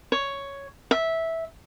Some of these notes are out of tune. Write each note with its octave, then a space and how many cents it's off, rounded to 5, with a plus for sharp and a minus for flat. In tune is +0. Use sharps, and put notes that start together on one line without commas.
C#5 +5
E5 -10